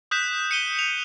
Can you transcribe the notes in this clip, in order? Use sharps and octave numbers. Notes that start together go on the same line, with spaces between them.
D#6 F#6 G6 B6 E7
C#7 D#7 G7
F7